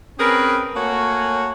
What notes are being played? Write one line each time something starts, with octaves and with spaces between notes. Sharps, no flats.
C4 C#4 G#4 A#4 B4
A3 A#3 F#4 C#5 G#5